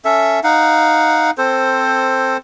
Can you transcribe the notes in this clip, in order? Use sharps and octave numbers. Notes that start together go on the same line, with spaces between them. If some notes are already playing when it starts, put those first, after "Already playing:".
C#4 A4 E5
D#4 F5 F#5
C4 A4 C5